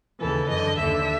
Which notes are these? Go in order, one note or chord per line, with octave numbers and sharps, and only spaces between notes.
D#2 C#3 E3 A4
F#2 D3 D#5
D#2 D3 E5